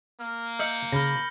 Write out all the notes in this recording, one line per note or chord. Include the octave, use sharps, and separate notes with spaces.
A#3 F6
D#5 E5 G6 C#7 F#7
C#3 B5 F6 A#6